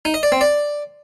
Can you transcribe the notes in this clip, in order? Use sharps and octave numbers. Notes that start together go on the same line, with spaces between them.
D#4
D#5
D5
C4
D5